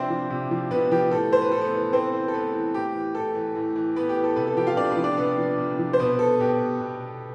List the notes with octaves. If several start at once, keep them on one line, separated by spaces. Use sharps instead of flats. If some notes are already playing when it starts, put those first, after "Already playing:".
Already playing: C3 F3 C4 D4 E4 C5 E5
F3
C3
F3
C3 B3 B4
F3 G4
A2 A4
E3 C5
B4
A2 A4
B3 B4
E3
A2 C4 C5
E3
A4
A2 B3 B4
E3
A2 G4
E3
A2 A4
E3
A2
E3
A2 B3 B4
G4
E3
A4
C3 B3 B4
A4
F3 G4 G5
F4 F5
C3 D4 D5
B3 B4
F3
D4 D5
C3 B3 B4
F3
C3
F3
C5
B2 B3 B4
A4
B2 G4
B2